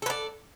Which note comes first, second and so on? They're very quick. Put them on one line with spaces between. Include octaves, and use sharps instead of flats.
A4 B4 D5